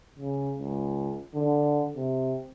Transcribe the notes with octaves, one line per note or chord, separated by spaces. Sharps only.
C#3
C#2
D3
C3